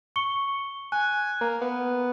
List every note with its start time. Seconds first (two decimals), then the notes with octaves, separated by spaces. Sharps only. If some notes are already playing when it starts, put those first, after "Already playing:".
0.16 C#6 C#7 G7
0.92 G#5 F#6
1.41 A#3 A#5
1.61 B3